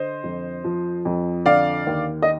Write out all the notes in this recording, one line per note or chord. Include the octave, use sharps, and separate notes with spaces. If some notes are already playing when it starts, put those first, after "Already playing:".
Already playing: D3 C5 D#5
F2
F3
F2
D3 D5 F5
D#2
D#5